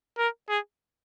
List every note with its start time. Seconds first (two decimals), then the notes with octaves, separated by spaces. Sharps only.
0.18 A#4
0.49 G#4